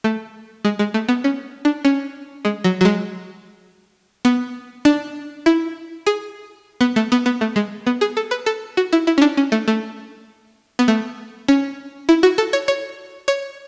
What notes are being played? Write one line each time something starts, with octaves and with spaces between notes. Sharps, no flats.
A3
G#3
G#3
A3
B3
C#4
D4
C#4
G#3
F#3
F#3
G#3
B3
D4
E4
G#4
B3
A3
B3
B3
A3
G#3
B3
G#4
A4
B4
A4
F#4
E4
E4
C#4
D4
C#4
A3
A3
B3
A3
C#4
E4
F#4
A4
C#5
C#5
C#5